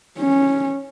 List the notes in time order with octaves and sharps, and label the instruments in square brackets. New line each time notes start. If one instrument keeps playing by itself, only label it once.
[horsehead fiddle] C#4